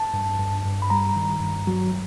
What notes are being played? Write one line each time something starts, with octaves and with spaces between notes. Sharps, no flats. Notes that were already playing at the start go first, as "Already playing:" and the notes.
Already playing: A5
G2
G2
G2
B5
G3 A#5
D#3
G2
F#3